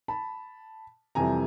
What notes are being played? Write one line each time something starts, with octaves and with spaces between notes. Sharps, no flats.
A5 B5
F2 C3 E3 G3 G#5 A#5